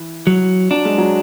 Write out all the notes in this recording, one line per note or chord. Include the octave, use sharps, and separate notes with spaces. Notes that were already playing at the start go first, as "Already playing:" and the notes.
Already playing: E3
F#3
F#3 D4
G#3
F#3